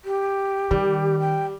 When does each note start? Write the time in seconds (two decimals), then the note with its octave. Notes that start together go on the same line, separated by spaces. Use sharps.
0.04 G4
0.71 D#3 G3
1.20 G5